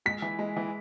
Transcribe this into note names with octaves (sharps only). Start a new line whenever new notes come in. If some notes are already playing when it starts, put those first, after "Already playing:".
G#3 B6
E3
G#3
E3